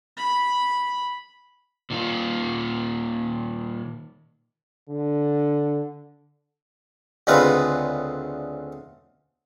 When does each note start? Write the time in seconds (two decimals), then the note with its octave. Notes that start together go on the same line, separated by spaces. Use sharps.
0.17 B5
1.90 A#2 D#3 F4
4.90 D3
7.27 D2 C#3 G#3 C4 F4 B4